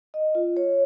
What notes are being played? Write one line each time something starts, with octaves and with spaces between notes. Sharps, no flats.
D#5
F4
C#5